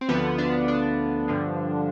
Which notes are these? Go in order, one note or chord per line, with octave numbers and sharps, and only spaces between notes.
C4
D2 D3 F3 B3
D4
D4
G2 D3 F3